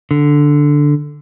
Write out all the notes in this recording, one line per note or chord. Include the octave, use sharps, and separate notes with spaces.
D3